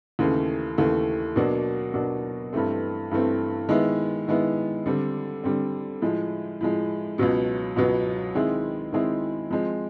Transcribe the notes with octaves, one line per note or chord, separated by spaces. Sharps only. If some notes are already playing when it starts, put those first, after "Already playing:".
D#2 C#3 E3 A3
D#2 C#3 E3 A3
B2 F#3 A#3 D4 F#4
B2 F#3 A#3 D4 F#4
G2 E3 A3 C4
G2 E3 A3 C4
D#3 G#3 B3 E4
D#3 G#3 B3 E4
D3 G3 C4
D3 G3 C4
A2 F3 G#3
A2 F3 G#3
C#2 B2 F#3 B3
C#2 B2 F#3 B3
D#3 G#3 C4 E4 G#4
D#3 G#3 C4 E4 G#4
F3 G#3 C4